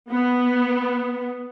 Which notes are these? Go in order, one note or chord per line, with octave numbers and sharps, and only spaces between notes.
B3